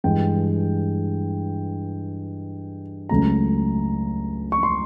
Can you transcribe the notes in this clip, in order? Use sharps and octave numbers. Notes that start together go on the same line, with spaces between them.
G2 E3 G#3 G5
C#2 C#3 F#3 A3 A#5
C#6
C6